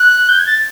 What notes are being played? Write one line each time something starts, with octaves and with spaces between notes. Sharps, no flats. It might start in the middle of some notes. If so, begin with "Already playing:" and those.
Already playing: F#6
G6
G#6
A6